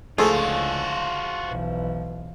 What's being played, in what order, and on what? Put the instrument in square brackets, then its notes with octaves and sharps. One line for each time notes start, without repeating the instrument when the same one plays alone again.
[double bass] C#2 D3 [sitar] F3 [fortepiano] A3 G#4 A4 [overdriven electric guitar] F4 F#4
[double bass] B1 E3